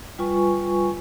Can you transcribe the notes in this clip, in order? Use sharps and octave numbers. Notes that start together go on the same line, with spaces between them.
G3 F4 B4 G#5 C#6